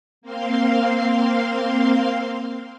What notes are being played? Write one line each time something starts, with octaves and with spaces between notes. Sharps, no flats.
A#3 C4 F5 C6